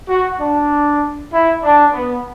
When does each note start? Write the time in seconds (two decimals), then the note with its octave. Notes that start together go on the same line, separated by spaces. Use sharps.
0.09 F#4
0.40 D4
1.32 E4
1.63 D4
1.93 B3